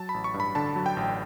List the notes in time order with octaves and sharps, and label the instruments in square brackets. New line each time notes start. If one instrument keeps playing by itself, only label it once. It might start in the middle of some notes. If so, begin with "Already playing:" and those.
Already playing: [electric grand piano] F#3 A5
B5
A1
C#6
G2
B5
D3 A5
F#3
G5
A1